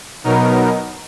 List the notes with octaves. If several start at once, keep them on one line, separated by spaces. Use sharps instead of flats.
B2 F#3 B3 D#4 A#4